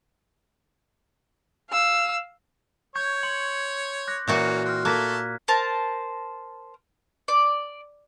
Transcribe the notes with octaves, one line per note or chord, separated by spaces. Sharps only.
F5 E6
C#5 C#6 G6 G#6
C6 C#7 F#7
D6 F#6 A#6
A#2 E3 A#3 C#4 F#4
C4 F6 F#6
A3 A#3 A4 F#6 G#6 B6
A#4 C5 A5
D5